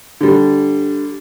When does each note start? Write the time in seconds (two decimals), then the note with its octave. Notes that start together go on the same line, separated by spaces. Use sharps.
0.21 D3 G3